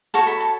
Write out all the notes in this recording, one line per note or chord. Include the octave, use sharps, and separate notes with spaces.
F#4 A4 C#5 C#6
B5
A5